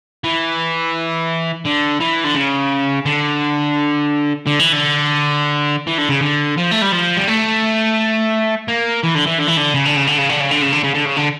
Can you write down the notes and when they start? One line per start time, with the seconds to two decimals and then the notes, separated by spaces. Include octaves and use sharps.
0.24 E3
1.65 D3
2.00 E3
2.24 D3
2.35 C#3
3.06 D3
4.47 D3
4.59 E3
4.73 D3
5.87 E3
5.98 D3
6.09 C#3
6.21 D3
6.58 F3
6.71 A3
6.82 G3
6.92 F3
7.17 G3
7.27 A3
8.68 A#3
9.04 E3
9.15 D3
9.27 E3
9.39 D3
9.48 E3
9.57 D3
9.74 C#3
9.85 D3
9.96 C#3
10.07 D3
10.18 C#3
10.29 D3
10.40 C#3
10.51 D3
10.62 C#3
10.73 D3
10.84 C#3
10.95 D3
11.06 C#3
11.17 D3